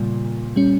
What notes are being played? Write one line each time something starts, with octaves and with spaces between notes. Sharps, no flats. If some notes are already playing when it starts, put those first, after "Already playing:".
Already playing: A#2 C#3 G3
G3 C#4